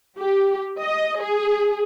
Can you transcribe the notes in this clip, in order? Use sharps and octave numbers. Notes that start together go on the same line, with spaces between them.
G4
D#5
G#4